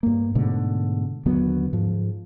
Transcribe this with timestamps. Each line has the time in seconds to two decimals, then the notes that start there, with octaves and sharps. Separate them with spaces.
0.03 G2 A#3
0.35 G#2 B2 D3 A3
1.26 D#2 D3 F#3 B3
1.73 G#2 F3